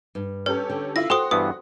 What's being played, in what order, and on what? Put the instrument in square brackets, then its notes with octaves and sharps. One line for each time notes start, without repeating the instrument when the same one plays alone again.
[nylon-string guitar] G2
[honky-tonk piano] C#4 G4 A4 [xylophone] B4
[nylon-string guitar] D3
[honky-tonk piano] E4 F4 [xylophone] A#6
[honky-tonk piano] F#4 C6 [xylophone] A4 C5 D#6 [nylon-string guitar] G5
[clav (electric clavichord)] G2 E3 B3 [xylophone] D#6